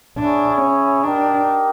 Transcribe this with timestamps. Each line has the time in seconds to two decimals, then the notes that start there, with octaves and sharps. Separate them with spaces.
0.18 D4 E4 G#4 C#5
0.62 C#4
1.04 D4 D#4 G4 A#4